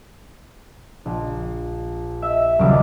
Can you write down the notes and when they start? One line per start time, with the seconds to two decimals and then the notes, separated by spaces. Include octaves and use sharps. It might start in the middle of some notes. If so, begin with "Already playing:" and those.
1.06 A#1
2.22 E5
2.59 D#1 C#3 F#3 G3 D6